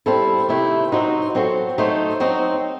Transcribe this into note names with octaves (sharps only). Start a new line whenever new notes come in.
G3 C4 E4 A4
C3 D#3 A3 C4 E4
F#3 C4 D#4 F#4
F#3 C4 F#4 A4 C5
F#3 A3 D#4 A4 C5
F#3 C4 D#4